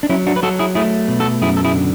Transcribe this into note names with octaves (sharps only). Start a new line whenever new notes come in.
D4
F#3 C#4 E4
D4 F#4
B4
F#3 F#4 A4
E4 G#4
A3 E4 G#4
B2
F#4 A4
F#2 E4 G#4
A4
E4 G#4
D3